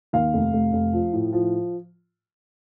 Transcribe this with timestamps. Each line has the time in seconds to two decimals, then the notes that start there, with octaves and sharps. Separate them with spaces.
0.13 D#2 F5
0.34 F1
0.53 F1
0.73 F1
0.93 F3
1.13 A2
1.33 F3